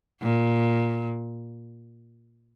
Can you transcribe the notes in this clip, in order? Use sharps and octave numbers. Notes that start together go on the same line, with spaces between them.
A#2